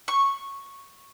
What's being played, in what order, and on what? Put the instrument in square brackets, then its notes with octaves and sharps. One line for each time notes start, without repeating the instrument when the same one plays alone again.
[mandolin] C#6